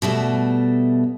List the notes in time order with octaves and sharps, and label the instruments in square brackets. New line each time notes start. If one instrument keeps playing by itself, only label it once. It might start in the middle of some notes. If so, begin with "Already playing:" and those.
[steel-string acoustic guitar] B2 G3 A3